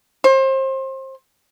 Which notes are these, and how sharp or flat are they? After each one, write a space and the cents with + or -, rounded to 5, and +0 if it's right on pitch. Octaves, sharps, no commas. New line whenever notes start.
C5 +30